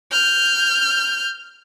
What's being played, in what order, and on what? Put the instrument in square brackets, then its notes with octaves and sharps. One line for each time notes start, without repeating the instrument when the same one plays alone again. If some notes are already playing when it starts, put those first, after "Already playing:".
[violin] F6 G6